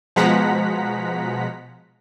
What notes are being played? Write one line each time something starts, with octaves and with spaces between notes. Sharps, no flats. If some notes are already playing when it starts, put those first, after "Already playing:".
B2 F3 G#3 F#5 A#5 B6